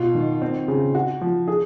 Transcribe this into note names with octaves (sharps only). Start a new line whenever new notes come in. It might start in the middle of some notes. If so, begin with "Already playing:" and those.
Already playing: B2 F4
D#3
C4
C#3
F#4
F3
G#4